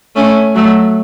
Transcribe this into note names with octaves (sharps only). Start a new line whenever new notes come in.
A3 C#4
F#3 A3